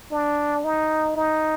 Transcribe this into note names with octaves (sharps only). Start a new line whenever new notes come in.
D4
D#4
D#4